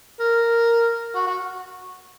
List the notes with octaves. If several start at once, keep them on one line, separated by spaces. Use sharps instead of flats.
A#4
F#4
F#4